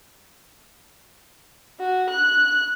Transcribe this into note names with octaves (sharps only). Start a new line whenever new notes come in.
F#4
F#6